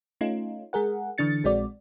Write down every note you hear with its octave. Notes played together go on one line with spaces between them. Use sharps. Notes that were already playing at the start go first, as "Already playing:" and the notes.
A3 C#4 D#4 F4
G#3 G#4 A#4 F#5
D3 E3 D4 A6 C#7
A#1 G#3 C4 F#4 D5